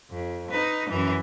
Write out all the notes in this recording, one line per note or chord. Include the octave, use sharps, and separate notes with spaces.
F2
D#4 B4
F#2 E3